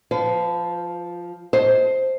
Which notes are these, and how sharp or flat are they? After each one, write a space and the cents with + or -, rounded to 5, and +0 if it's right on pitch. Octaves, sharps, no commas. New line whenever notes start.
F3 +0 B4 +45
C5 +0 D#5 +25 A5 +0